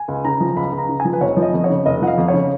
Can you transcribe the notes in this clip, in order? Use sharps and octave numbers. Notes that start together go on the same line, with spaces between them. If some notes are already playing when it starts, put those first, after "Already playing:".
Already playing: G#5
C#2
C#3 A#5
F3
C#2 B5
C#2
A#5
C#3
G#5
F3
B4
F1 C#5
F3
D#5
F2
C#5
C#3
F1 D#5
F3 F#5
F5
F2
C#3 C#5